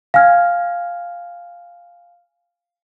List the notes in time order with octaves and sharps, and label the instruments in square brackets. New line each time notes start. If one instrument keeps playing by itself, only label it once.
[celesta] F5 G#5 F6 G#6